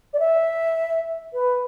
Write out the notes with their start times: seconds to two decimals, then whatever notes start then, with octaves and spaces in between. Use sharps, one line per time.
0.14 D5
0.20 E5
1.34 B4